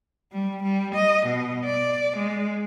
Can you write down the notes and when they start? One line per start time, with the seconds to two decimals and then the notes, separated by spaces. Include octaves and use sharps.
0.33 G3
0.63 G3
0.95 D#5
1.27 B2
1.65 D5
2.18 G#3